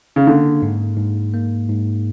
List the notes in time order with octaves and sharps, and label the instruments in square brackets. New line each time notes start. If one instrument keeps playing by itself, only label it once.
[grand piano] C#3
[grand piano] D3 [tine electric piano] A#3
[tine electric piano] G#2
G#2
A#3
G#2